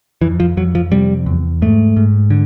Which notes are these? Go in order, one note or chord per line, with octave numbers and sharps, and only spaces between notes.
F2 E3
F3
F2 F#3
F3
C3 G3
E2
G#2 A3
G#2
D3